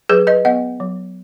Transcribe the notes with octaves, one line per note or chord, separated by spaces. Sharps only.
F#3 G#4 B4
B4 D#5
B3 D#5 F#5
F#3